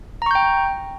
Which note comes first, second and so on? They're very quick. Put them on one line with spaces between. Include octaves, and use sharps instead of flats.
A#5 C#6 G6 G5